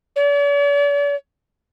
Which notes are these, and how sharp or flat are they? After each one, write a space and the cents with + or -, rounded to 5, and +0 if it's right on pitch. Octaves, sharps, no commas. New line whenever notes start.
D5 -45